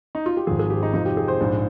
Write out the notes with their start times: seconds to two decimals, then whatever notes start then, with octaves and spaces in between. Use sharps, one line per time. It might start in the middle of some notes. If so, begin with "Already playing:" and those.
0.15 D#4
0.26 F4
0.37 G4
0.47 G#1 G#2 F3 G#4
0.59 G#4
0.70 G4
0.83 D#4
0.93 F2 C3 F3 D#4
1.05 G4
1.17 G#4
1.28 C5
1.40 A#1 G#2 F3 G#3